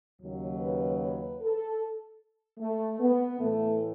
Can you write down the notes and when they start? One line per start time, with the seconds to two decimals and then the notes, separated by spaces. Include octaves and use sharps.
0.22 D#2 C#3 F#3
0.61 B4
1.01 B4
1.41 A4
2.60 A3
3.00 B3
3.40 A2 E3 A3